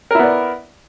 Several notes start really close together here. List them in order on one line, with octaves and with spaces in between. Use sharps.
A#4 E4 B3 D5